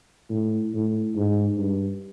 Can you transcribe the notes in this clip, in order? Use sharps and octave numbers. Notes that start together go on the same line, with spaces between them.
A2
A2
G#2
G2